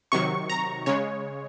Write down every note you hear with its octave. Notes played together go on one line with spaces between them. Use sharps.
C3 D#3 F#3 C#6
A#5
C#3 G#3 C#5